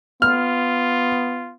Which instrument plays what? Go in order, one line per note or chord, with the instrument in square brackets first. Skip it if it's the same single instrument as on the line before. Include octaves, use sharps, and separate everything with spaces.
[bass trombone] B3 [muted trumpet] F4 [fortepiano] F6